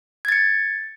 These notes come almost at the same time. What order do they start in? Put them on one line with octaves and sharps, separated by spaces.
G#6 A6 C#7